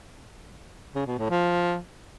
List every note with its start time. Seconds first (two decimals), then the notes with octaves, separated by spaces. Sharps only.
0.95 C#3
1.07 B2
1.18 A2
1.30 F3